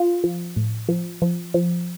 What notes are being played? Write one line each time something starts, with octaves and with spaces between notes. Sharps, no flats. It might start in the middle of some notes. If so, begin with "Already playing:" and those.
Already playing: F4
F3
A2
F3
F3
F3